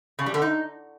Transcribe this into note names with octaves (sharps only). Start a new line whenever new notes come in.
C#3
G3
D3
D#4